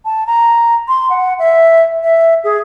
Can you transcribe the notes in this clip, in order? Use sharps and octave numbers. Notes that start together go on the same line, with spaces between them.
A5
A#5
C6
F#5
E5
E5
G#4